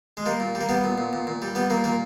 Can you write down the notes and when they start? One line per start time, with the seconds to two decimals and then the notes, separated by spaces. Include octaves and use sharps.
0.17 G#3
0.26 G3 A#3
0.40 A#2
0.55 G3
0.61 A#3
0.69 G3 B3
0.84 A#2
0.98 A#2
1.13 A#2
1.27 A#2
1.42 G3
1.55 G3 B3
1.70 A#2 A#3
1.84 A#2 A#3